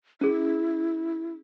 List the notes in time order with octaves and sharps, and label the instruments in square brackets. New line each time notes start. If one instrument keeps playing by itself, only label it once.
[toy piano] C#4 G#4 [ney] E4